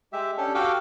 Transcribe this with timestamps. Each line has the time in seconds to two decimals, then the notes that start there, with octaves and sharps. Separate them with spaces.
0.13 G#3 G4 E5
0.38 C#4 D4 G4 A4
0.55 F#4 G4 A4 F5 G5 D6